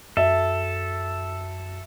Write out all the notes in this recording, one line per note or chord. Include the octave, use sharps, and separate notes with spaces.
F#2 F#4 A4 E5